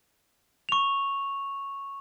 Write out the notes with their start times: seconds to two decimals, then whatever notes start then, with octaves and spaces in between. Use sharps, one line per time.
0.69 C#6 F7